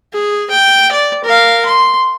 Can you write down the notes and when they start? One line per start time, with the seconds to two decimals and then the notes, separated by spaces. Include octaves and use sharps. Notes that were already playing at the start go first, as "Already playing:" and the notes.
0.14 G#4
0.51 G5
0.92 D5
1.25 A#4 F5
1.66 C6